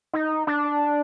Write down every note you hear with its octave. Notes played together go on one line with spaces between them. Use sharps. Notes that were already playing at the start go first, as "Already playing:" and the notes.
D#4
D4